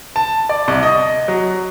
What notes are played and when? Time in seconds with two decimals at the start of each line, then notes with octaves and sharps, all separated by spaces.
0.16 A5
0.49 D5
0.68 C2
0.83 D#5
1.28 F#3